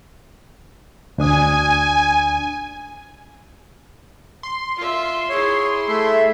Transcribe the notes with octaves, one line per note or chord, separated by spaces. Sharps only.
D2 D4 G#5 D#6
C6
F4 E5
E4 G#4 C#5
A3 E5